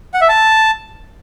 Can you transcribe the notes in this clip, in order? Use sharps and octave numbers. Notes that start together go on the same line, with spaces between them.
F#5
E5
A5